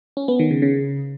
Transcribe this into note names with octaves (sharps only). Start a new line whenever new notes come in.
C#4
B3
D#3
C#3
C#3